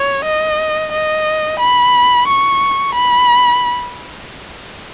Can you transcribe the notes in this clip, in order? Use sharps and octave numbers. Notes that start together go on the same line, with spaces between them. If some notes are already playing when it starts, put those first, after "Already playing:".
Already playing: C#5
D#5
D#5
B5
C#6
B5